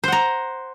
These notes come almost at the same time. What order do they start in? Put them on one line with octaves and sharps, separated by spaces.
C5 F#5 A#5